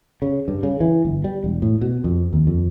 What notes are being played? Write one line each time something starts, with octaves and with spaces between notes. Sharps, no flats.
C#3
G2
C#3
E3
G1
G3
E1
A2
B2
F2
D#2
F2